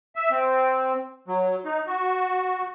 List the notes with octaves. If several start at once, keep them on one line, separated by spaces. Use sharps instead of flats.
E5
C4
F#3
D#4
F#4